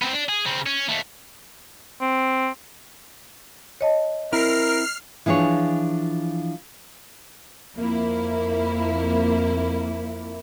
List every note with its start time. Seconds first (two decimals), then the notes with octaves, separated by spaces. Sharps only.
0.02 B3 C4
0.13 D4
0.29 G#4
0.46 C#3 C4
0.66 C#4
0.89 D#2 A3
2.01 C4
3.81 C#5 D#5 A5
4.32 C4 E4 A#4 F6 C7
5.26 E3 F3 D4 G#4 C#5
7.76 F2 A#3 E4